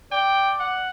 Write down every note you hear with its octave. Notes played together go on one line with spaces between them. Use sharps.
D5 G5
F#5